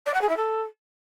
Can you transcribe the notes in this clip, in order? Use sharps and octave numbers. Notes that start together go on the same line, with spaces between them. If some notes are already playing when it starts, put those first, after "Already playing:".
D5
F#5
G#4
E4
A4